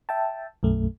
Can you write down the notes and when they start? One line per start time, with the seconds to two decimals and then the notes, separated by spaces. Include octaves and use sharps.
0.09 E5 G5 A5
0.63 B1 F#2 A3